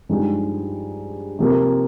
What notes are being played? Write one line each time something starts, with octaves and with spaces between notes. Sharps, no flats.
G2 F3 G#3 D#4 G4
C3 F3 A#3